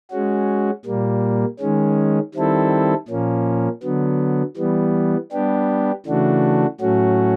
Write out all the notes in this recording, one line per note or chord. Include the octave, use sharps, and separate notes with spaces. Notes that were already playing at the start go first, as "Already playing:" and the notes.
G#3 C#4 F#4
A#2 G3 A#3
D#3 G#3 C#4
D#3 G3 C4 E4 A4
A#2 F3 A#3 C#4
D3 F#3 B3
E3 G3 B3
G3 B3 D4 G4
C#3 E3 A3 D4 F#4
A2 F#3 A3 C#4 F#4